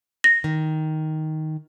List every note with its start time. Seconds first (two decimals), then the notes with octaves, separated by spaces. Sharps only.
0.24 A#6
0.44 D#3